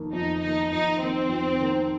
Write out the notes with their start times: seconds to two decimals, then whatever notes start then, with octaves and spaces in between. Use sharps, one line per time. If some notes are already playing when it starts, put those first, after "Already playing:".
Already playing: F2 D#3 A#3
0.13 F2 D#4
0.42 D#3 A#3 D#4
0.71 F2 D#4
1.00 D#3 A#3 C4
1.29 F2
1.58 D#3 A#3